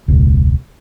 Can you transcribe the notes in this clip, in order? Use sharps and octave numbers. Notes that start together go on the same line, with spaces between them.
E1 C#2